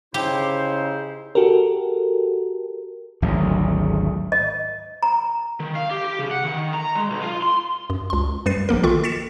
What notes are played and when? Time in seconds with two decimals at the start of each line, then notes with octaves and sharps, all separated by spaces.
0.14 C#3 D#4 E4 G4 C5
1.35 F#4 G4 A4 A#4
3.22 G#1 D2 F#3
4.32 D#5
5.03 A#5
5.60 D#3
5.75 F5
5.91 G4
6.04 G4
6.19 C#3
6.31 F#5
6.45 D#3
6.74 A#5
6.95 G#3
7.10 B1
7.22 F4
7.42 C6
7.90 F#2
8.10 C#2 C6
8.46 F#2 G3 B4 A6 C7 D#7
8.69 A#1 F3 A#3 A#4
8.83 D#3 F4 A4 C#6
9.04 A6 B6 C#7 E7